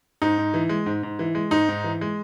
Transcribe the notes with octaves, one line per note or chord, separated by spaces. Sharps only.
G#2 D#4
G#2
E3
G#3
G#2
G#2
E3
G#3
G#2 D#4
G#2
E3
G#3